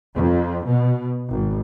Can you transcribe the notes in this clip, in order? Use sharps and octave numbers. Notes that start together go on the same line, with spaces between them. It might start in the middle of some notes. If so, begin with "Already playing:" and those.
F2
B2
G#1